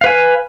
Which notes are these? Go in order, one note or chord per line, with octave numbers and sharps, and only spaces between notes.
B4 F5 G#5